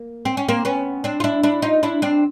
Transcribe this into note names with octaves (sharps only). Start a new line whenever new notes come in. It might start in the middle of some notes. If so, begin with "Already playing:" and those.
Already playing: A#3
C4
C#4
A#3 C4
B3 C#4
C4 D4
F4
D4 E4
D4 E4
D#4 F4
D4 E4
C4 D4